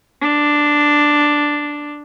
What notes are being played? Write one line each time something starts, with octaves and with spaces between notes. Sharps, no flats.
D4